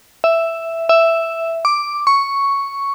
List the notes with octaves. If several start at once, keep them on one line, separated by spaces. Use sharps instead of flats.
E5
E5
D6
C#6